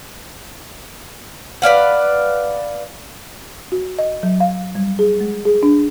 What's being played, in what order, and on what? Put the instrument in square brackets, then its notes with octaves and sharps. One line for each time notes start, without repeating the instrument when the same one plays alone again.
[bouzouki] B4 D5 F5 F#5
[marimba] F#4
D#5
F#3
F5
G3
G#4
G#3
G#4
D4